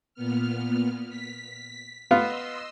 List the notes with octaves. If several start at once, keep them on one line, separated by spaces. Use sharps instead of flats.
A#2 B3 F6
B6
B3 F4 D#5 C6 E6